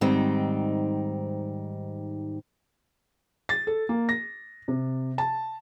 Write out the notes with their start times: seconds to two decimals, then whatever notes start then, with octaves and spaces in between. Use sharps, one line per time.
0.01 G#2 D#3 G3 C4 D#4
3.49 A6
3.67 A4
3.89 A#3
4.09 A#6
4.68 C3
5.18 A5